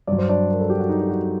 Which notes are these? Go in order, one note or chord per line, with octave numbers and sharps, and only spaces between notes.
G2 F#3 D5
C5
D4 D5
A#4
A4
G4
F#4
D#4
G4
F#4